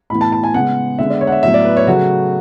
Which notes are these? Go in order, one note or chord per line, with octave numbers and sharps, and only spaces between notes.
A2 E3 B3 B5
A5
A5
G#5
C#3 G#3 B3 F#5
D3 G#3 B3 E5
D5
C#5
F#5
E5
A2 F#3 B3 E5
D5
B4
C#5
C#3 F#3 A3 F#4